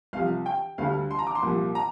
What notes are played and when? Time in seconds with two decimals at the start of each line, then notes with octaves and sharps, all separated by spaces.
0.13 C2 C3 F3 F5
0.46 G5
0.78 D2 D3 G3 F5
1.11 C6
1.19 A#5
1.27 D6
1.35 C6
1.43 C2 A#2 F3
1.75 A#5